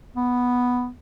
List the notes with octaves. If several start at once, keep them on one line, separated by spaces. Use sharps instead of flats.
B3